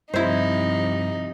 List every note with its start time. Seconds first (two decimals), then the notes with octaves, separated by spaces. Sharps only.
0.14 G2 C3 F3 C4 D#4 E4 C5